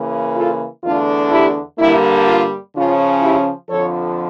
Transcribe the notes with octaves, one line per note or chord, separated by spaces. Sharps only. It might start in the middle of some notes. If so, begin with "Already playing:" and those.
Already playing: C#3 E3 A#3
F4 A4
E2 D3 A3 D4 F4
E4 G4
G2 D3 G3 A#3 E4
F4
C#3 F3 C#4 F4
E4 G4
F2 D3 F3 A4 C#5